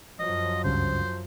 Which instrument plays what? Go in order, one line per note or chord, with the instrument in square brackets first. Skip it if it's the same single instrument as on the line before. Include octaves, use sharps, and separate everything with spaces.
[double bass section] F#2 F3 F#3 [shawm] D#5
[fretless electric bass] C#2 G2 C#3 [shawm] C5